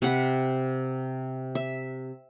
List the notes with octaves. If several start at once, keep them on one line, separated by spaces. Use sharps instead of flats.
C3 F#5 B5
E5